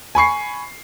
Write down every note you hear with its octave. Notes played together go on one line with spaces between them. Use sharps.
G#5 B5 C#6 C7